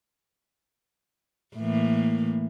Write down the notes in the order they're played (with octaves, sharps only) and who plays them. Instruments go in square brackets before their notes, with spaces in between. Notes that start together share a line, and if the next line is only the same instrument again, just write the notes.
[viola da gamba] A2 E3 A#3